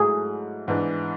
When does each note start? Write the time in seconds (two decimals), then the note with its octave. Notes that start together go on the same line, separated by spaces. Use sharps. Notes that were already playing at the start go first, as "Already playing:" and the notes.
Already playing: G#2 F#3 A3 E4 G#4
0.68 G#2 E3 B3 D4